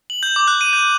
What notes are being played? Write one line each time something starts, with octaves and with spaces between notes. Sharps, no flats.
F#7
G6
D6
F#6
D#7
G6